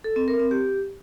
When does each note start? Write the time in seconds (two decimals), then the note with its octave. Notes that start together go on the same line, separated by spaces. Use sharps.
0.04 A4
0.16 C4
0.28 A#4
0.39 C4
0.51 G4